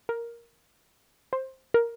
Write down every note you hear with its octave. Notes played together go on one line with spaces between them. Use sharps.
A#4
C5
A#4